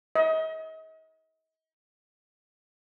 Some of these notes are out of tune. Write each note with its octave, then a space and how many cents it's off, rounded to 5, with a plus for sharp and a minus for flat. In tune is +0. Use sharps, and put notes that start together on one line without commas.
D#5 +40